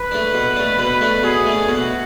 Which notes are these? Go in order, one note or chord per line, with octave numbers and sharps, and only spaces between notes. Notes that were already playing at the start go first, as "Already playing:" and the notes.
Already playing: B4
A3 D4
B2
A3 D4
B2 B4
A3 D4
B2 G#4
A3 D4
B2 F#4